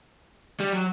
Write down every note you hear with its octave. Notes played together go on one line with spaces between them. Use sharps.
G3
F#3